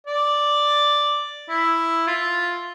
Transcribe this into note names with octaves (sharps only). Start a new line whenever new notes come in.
D5
E4
F4